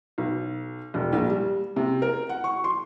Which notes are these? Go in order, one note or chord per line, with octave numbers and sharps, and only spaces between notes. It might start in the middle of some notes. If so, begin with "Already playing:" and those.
B1
E1
A#1
G3
C3
A#4
F#5
C#6
C6